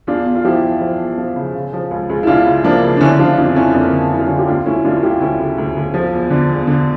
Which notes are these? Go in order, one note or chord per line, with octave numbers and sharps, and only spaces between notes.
E2 D4 F4
E2
F4
F3 E4 G4
F3
F3
E2
F3
C#3
C#3
F3
C#2
C#2
E4
C#2 D4 F4
C#3
F3 A#3 D4
C#3
D4
D3 C#4 E4
F3 D4 F4
F2 D4 F4
F2 C#4 E4
F2 A#3 D4
D3
F2 E4
F4
D3 C#4 E4
G4
D2 D4 F4
D2 C#4 E4
D2 D4 F4
F4
D2 E4 G4
D2 C#4 E4
C#3
D2
D2
F3
E2
D3
E2
D3